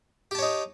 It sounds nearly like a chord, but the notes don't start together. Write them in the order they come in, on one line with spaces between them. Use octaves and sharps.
G4 A5 C#5 D#4